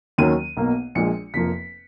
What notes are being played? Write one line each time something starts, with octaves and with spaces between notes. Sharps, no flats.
D#2 D#3 F#3 C#4 D#7
B1 B2 A#3
A#1 A#2 F3 G#3 C#7
F1 F2 F3 A#3 B6